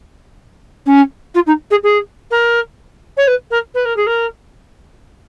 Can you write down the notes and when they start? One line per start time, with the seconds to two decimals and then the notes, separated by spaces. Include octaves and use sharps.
0.86 C#4
1.35 F4
1.46 D#4
1.71 G#4
1.83 G#4
2.31 A#4
3.17 C#5
3.27 B4
3.51 A#4
3.75 B4
3.85 A#4
3.96 G#4
4.07 A#4